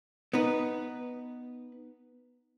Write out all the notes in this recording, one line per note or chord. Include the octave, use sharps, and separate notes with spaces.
B3 D#4 B4